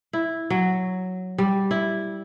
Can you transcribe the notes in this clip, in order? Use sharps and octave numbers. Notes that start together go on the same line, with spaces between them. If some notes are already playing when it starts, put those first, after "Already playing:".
E4
F#3
G3
E4